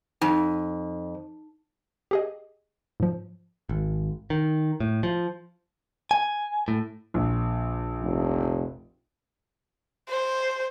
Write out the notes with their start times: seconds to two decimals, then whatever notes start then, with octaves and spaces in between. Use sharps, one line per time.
0.21 F2 D#4
2.11 G4 G#4 D#5
3.00 G#2 F3
3.69 G#1
4.30 D#3
4.80 A2
5.03 F3
6.11 G#5
6.68 A2
7.14 A#1
8.02 F1
10.09 C5